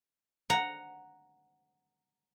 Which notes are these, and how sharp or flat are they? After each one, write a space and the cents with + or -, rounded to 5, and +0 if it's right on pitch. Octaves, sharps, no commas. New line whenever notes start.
F#5 +0 A#5 +0